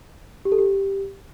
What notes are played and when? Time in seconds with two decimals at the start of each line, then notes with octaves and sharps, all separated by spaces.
0.45 G4
0.52 A4
0.58 G4